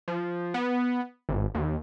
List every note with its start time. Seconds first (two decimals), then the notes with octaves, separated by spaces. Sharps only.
0.08 F3
0.54 B3
1.29 G#1
1.55 D#2